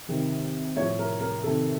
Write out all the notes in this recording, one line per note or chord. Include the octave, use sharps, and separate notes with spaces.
C3 D#3
A2 F3 C#5
A#4
A#4
C3 D#3 A4